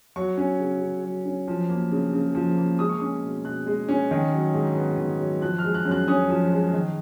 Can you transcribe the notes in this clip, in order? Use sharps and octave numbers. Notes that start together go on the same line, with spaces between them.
F#3 C#6
C#4
C#3
C#3
F#3
C#4
F3
A#3
C#3
C#3
F3
A#3
G#3 D#6
C#6
C#4 D#6
B2
B2 F#6
G#3
C#4
D#3
F#3
G#2
B3
D#3
F#3
F3 F#6
F6
G#3
F#6
F#2
F#6
C#4 D#6
F3
G#3
D#3